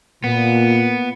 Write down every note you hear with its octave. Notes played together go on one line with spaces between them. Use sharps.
A#2 B3